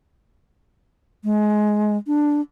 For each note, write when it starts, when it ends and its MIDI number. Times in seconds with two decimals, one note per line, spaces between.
1.24 1.97 56
2.07 2.41 62